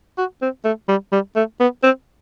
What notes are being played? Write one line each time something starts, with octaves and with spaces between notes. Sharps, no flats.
F#4
C4
A3
G3
G3
A3
B3
C4